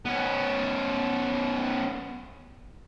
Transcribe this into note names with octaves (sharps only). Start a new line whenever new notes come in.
B3 C#4